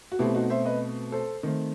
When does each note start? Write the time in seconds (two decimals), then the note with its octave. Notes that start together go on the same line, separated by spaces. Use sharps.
0.12 F#4
0.19 B2 A3 C4 E4 G4
0.34 D#4 F#4
0.50 C5 E5
0.65 B4 D#5
1.12 A4 C5
1.43 D#3 A3 C4